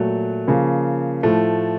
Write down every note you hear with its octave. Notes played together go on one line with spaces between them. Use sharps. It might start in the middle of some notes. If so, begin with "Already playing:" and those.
Already playing: A#2 F#3 A3
C#3 F3 A#3
A2 F3 A3